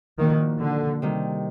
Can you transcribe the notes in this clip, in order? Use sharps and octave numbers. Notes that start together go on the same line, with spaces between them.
A#2 D#3 F3 A#3 D4 F#4
D3
C3 D#3 G3